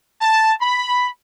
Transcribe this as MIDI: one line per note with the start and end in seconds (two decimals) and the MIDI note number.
0.21 0.53 81
0.61 1.09 83